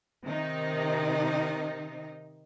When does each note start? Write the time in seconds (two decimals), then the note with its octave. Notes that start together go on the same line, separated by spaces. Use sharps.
0.24 C3 D#3 D#4